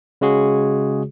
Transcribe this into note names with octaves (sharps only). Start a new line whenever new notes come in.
C#3 G#3 F#4 G#4